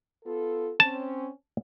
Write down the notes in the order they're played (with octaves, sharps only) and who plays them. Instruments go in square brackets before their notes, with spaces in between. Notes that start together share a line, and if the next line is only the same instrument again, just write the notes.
[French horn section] B3 F4 A4
[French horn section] C4 C#4 [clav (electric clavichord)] A5